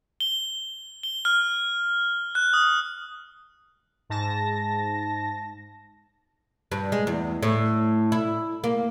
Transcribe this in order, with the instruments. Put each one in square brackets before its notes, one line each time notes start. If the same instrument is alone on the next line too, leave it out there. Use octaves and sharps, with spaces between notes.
[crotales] G7
G7
F6
F#6
D#6
[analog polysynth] G#2 A5 A#6
[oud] G2
G#3
E2
A2
E4
A#3